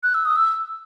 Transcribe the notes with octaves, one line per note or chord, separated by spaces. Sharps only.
F#6
E6
D#6
E6